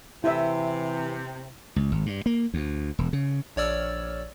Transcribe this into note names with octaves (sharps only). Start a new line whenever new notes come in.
C3 E3 E4 E5
C#2
G#1
G2
A#3
D2
E1
C#3
A#1 C#5 D5 E6 F6